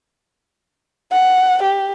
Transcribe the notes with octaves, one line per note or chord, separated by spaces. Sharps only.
F#5
G4